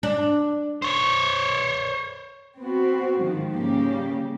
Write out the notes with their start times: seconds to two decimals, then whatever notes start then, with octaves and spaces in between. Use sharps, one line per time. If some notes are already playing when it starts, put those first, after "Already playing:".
0.03 D4
0.82 C5 C#5
2.59 B3 C4 F#4
3.20 G#2 D#3 F3
3.53 C#3 G3 A#3 G4